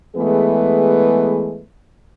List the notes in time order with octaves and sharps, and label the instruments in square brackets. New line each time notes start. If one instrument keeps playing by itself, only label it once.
[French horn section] E3 G#3 A3 B3 G#4 B4